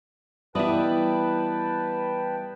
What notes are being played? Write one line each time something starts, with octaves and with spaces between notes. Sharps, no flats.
E3 G3 B3 E4 B4 D#5 G5 A5